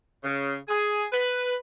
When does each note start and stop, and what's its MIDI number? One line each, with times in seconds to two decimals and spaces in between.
0.24 0.55 49
0.68 1.04 68
1.13 1.55 71